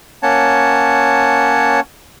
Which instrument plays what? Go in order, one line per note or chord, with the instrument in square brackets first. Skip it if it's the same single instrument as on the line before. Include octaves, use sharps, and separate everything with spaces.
[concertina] A#3 C#4 C#5 F#5 A5